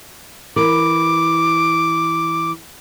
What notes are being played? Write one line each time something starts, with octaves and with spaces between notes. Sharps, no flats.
E3 A#4 D6